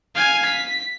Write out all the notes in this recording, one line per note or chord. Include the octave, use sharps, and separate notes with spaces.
F5 G#5
B6